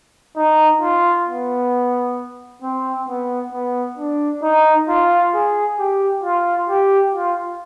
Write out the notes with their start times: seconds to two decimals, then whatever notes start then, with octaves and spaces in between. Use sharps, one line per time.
0.37 D#4
0.82 F4
1.27 B3
2.62 C4
3.08 B3
3.53 B3
3.98 D4
4.43 D#4
4.89 F4
5.34 G#4
5.79 G4
6.24 F4
6.69 G4
7.14 F4